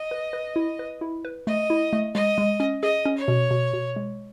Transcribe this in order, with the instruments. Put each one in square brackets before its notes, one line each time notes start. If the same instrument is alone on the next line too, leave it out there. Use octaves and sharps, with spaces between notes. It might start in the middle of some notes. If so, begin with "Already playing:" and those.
Already playing: [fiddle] D#5
[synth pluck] B4
B4
E4
B4
E4
B4
[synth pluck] A3 [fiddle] D#5
[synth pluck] E4
A3
[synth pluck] G#3 [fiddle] D#5
[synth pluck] G#3
C#4
[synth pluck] G#4 [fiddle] D#5
[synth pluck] C#4
[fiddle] C#5
[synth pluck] B2
B2
B2
G#3